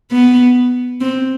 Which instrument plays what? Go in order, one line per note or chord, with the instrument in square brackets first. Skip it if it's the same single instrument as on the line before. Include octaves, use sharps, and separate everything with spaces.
[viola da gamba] B3
C4